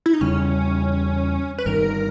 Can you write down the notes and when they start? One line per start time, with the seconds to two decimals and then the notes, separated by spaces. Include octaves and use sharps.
0.06 E4
0.13 D#4
0.21 E2 C#3 G3 C#4
1.58 B4
1.65 G1 G2 D#3 A#4